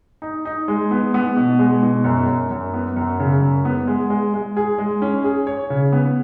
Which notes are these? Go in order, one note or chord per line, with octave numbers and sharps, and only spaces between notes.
D#4
D#4
G#3
B3
B3
B2
G#3
B2
F#2
F#2
F#2
B3
F#2
C#3
F#2
B3
G#3
G#3
G#3
G#4
G#3
C#4
G#4
C#5
C#3
B3